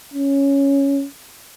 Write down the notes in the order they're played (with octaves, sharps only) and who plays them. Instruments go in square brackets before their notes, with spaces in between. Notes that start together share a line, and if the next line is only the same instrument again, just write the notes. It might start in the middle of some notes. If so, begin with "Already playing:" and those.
[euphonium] C#4